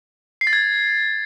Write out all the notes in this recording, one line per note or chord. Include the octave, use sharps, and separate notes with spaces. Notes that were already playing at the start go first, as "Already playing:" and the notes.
C7
A6
G#6